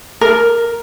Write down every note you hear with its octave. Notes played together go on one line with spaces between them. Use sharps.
A#4